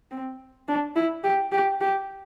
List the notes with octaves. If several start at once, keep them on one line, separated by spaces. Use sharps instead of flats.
C4
D4
E4
G4
G4
G4